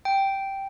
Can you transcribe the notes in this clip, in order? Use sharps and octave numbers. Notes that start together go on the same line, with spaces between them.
G5